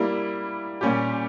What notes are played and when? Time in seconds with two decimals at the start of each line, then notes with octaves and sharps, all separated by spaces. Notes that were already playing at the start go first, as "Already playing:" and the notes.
Already playing: G3 A#3 E4
0.81 A#2 G3 C#4 G4